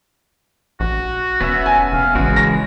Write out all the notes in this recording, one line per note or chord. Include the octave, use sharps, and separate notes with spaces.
A#1 F#4
E1 B3 C#4 E5
G#5
F1 F5
A1 C#3 E3 G#3 F#4
A#6